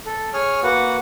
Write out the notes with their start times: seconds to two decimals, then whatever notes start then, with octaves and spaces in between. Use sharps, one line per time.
0.06 A4
0.33 G#4 C#5 G#5 F6
0.63 A#3 F#4 B4 F#5